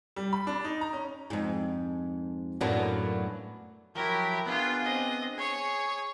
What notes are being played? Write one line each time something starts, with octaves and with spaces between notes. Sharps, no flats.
G3
B5
D4
D#4
A#5
C#4
F2 G#2
F#2 A2 F#3 A#3 B3 D4
F3 F#3 E4 G4 A#4
B3 D4 F4 G#4
C4 D#5
G#4 C#5